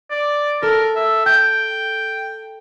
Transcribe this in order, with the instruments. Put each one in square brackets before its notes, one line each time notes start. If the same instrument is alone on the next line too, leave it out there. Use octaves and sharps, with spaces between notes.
[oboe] D5
[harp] A4 [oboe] A#4
[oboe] E5
[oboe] G5 [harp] G6